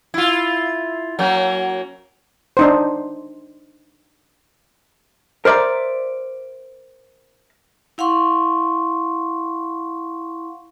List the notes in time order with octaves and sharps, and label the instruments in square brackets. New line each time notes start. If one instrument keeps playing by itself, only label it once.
[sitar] E4 F4
F#3 A#3 C#4
[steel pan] D4 D#4 C5
[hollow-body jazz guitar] A#4 C5 D5 E5 A#5
[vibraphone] E4 F5 F#5 C6 C#6